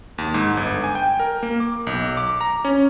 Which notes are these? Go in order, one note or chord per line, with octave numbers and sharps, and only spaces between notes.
D#2
G#2
G1
G#5
G5
A#4
A#3
D6
B1
D6
A#5
C#4